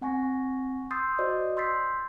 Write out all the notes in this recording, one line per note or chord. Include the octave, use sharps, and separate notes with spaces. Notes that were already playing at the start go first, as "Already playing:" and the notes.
C4 F#5 G#5 C#6 A#6
C6 D#6 E6 G6 A6 C7
F#4 C5 D5 D#5 D#6
C6 E6 G6 A6 B6 C7